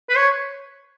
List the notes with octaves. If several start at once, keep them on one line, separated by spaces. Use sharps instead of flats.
B4
C#5